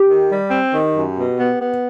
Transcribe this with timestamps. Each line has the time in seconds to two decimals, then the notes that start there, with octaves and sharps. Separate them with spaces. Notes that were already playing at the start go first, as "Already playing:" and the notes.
Already playing: G4
0.08 D#3
0.30 G3
0.51 C4
0.73 D#3
0.96 F#2
1.17 B2
1.38 B3
1.61 B3